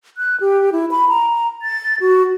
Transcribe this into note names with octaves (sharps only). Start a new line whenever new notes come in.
F#6
G4
E4
B5
A#5
A6
F#4